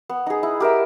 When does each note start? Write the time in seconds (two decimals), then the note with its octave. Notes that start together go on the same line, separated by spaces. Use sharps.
0.09 B3
0.26 D#4 G#4
0.43 E4
0.60 G4 A#4 E5